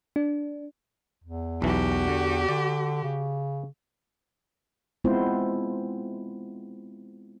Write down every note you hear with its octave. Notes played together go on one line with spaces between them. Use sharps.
D4
E2
B1 E3 F#4 G4
D3
D3 D5
C#3
G#3 B3 C4 E4 F4 C5